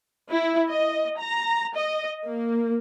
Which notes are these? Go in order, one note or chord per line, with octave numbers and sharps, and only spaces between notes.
E4
D#5
A#5
D#5
A#3